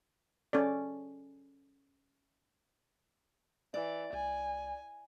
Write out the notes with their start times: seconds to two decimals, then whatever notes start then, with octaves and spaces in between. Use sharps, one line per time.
0.53 C#4 A4 D5
3.74 E3 D5
4.13 C2 G#5